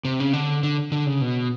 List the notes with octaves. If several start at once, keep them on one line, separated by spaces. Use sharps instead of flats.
C3
C#3
D3
D3
D3
C#3
B2